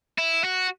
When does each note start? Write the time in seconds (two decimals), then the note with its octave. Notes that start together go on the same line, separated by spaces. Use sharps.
0.19 E4
0.44 F#4